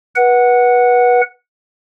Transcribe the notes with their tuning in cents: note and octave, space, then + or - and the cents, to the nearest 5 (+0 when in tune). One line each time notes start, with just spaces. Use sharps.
B4 -25 F#5 +0